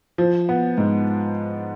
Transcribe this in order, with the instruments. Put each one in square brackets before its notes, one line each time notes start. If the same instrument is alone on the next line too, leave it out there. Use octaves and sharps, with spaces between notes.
[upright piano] F3
B3
G#2